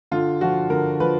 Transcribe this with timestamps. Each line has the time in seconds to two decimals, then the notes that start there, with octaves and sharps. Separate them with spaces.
0.11 D3 F4
0.41 F3 F#4
0.70 D3 A#4
1.00 F3 B4